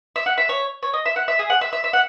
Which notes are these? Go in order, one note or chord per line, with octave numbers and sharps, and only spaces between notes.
E5
F#5
E5
C#5
C#5
D#5
E5
F#5
E5
G#4
F#5
E5
E5
E5
F#5